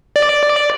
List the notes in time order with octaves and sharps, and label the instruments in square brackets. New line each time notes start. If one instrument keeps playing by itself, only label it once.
[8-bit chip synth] D5